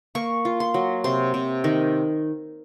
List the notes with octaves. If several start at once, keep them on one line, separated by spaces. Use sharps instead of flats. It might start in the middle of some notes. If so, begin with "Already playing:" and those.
A#3 C#6
F4
C6
F#3
C3 C6
C3
D#3